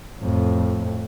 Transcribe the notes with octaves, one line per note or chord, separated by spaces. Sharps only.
F2 A2